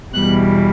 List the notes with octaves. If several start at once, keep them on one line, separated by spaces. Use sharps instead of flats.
E2 B2 G3 F#6